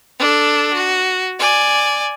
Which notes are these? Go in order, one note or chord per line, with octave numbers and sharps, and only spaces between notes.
D4 A4
F#4
D5 G#5